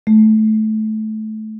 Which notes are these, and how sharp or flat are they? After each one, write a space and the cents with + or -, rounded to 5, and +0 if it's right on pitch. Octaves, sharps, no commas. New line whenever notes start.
A3 -20